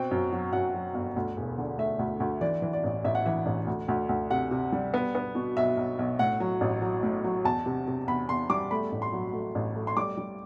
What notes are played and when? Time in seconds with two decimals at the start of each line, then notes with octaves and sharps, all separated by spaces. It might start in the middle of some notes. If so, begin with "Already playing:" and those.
Already playing: B2 C4 G5
0.11 F#2
0.32 F#3
0.53 F#2 F#5
0.74 F#3
0.94 G1
1.16 D2
1.37 E1
1.58 D3
1.78 A3 E5
1.99 D2
2.20 D2
2.41 E3 D5
2.62 E3
2.73 D5
2.84 A1
3.04 A1 E5
3.15 F#5
3.26 E3 E5
3.46 A1
3.67 D2
3.88 D2
4.09 D2
4.30 C3 F#5
4.51 C3
4.72 G3
4.94 B3
5.15 B3
5.35 B2
5.57 B1 E5
5.77 B1
5.99 B1
6.19 A2 F#5
6.40 F#3
6.61 A1
6.82 F#3
7.03 A2
7.24 F#3
7.45 E2 A5
7.66 C3
7.87 C3
8.08 E2 B5
8.29 E2 C6
8.50 G3 D6
8.71 A3 B5
8.92 A1
9.02 C6
9.13 F#3
9.33 A3
9.55 A1
9.75 A3
9.87 C6
9.97 G3 D6
10.17 G3